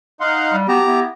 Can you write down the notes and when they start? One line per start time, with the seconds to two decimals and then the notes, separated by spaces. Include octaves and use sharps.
0.21 D#4 F5 F#5 C6
0.53 G3
0.68 F#3 B3 G4 A5 A#5
0.85 B3 E4